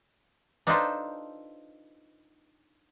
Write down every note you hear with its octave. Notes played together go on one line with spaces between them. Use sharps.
D4 D#4 F4 A4 B4 C5